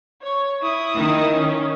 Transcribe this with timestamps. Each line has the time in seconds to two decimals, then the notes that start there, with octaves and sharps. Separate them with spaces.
0.22 C#5 C#6
0.62 E4 D#6
0.98 D#3
1.34 C#4